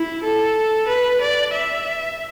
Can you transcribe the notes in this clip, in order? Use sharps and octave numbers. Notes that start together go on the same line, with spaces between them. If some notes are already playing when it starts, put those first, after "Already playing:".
Already playing: E4
A4
B4
D5
E5